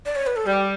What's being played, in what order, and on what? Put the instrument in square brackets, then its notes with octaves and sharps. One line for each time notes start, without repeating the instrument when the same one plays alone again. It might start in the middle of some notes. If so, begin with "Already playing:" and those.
[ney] D5
C#5
B4
A4
[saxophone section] G3 [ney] G4